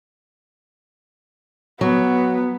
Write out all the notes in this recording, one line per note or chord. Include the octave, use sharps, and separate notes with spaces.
F#3 B3